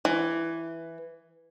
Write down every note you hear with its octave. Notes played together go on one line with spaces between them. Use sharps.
E3